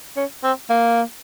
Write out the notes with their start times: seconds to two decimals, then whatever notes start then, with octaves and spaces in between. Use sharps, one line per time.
0.17 C#4
0.44 C4
0.70 A#3